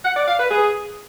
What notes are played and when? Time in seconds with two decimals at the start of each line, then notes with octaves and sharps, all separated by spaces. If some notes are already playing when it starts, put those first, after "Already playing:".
0.05 F#5
0.16 D5
0.28 F5
0.39 B4
0.51 G#4